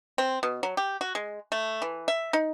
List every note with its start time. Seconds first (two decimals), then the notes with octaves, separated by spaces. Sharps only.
0.18 C4
0.43 B2
0.63 F#3
0.77 G4
1.01 F#4
1.15 G#3
1.52 A3
1.82 E3
2.08 E5
2.33 D#4